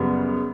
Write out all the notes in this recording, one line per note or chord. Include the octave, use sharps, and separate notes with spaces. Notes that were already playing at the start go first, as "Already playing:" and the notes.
Already playing: F#2 C#3 G3 B3